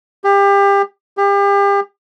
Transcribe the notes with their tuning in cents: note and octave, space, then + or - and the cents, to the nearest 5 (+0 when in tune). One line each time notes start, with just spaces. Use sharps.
G4 +30
G4 +35